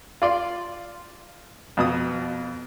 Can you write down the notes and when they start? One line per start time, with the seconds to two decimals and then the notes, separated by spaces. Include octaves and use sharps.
0.22 F4 D5 C6
1.77 F2 B2 D#6